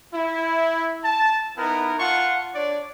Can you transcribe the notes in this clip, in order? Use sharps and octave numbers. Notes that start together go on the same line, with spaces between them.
E4
A5
B3 D#4 E4 A#4
F4 F#5 A5 C6 C#6
D4 C#5 D5